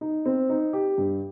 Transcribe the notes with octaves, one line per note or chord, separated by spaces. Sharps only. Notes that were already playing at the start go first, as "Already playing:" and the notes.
D#4
C4
D#4
G4
G2